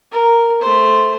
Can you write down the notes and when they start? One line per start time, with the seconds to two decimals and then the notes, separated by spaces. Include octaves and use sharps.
0.12 A#4
0.62 A3 C5